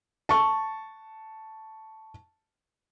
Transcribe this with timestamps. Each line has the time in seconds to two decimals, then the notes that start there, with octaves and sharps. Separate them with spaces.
0.29 A5 C#6